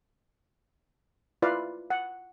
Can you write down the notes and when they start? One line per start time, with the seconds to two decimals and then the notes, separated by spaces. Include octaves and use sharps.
1.42 E4 F4 B4 D5 F5
1.90 F#5